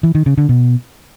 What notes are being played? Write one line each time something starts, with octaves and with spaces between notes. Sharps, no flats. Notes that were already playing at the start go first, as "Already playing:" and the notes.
E3
D#3
C#3
D3
B2